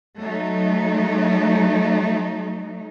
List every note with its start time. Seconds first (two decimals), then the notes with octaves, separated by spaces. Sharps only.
0.19 F#3 A3 D#4